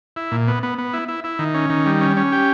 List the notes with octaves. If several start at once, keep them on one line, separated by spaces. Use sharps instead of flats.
E4
A#2
B3
B3
B3
E4
E4
E4
D#3
C#4
D#3
G3
C#4
C#4
G4